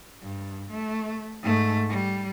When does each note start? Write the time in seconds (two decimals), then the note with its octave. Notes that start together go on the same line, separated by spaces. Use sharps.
0.21 G2
0.71 A3
1.42 G#2 A3
1.90 G3